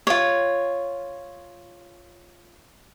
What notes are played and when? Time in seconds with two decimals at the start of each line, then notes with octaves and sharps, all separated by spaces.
0.07 F4 C#5